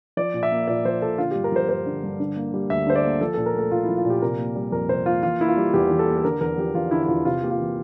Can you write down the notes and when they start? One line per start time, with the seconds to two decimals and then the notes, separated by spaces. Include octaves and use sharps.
0.17 F3 D5
0.34 A#2
0.43 E5
0.51 A#3
0.68 A#2 D5
0.85 F3 C5
1.02 A#2 A4
1.18 D3 F4
1.31 G4
1.35 G2
1.44 A#4
1.52 F3 C5
1.69 G2 C5
1.86 D3
2.03 G2
2.20 D3
2.37 A#3
2.54 G3
2.70 D2 E5
2.87 D3 C5
2.95 D5
3.04 A#3
3.21 F3 A4
3.34 A#2 A4
3.46 A#4
3.54 A3 A4
3.71 A#2 F4
3.84 E4
3.89 F3
3.97 F4
4.05 A#2
4.10 G4
4.22 C3 A#4
4.39 A#3
4.55 G3
4.72 F2 A#4
4.89 C3 C5
5.06 A#3 F4
5.23 E3 F4
5.40 A#3 E4
5.48 F4
5.57 G3
5.74 E2 G4
5.91 E3
5.99 A4
6.07 A#3
6.18 A4
6.24 D3 A#4
6.41 E2 A#4
6.58 F3 G4
6.74 E2 F4
6.91 D3 E4
7.04 E4
7.08 E2 F4
7.25 C3 F4
7.43 A#3 G4
7.51 F4
7.59 E3